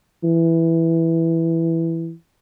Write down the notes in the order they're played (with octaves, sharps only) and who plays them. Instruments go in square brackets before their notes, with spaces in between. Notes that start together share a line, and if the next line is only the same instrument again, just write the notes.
[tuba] E3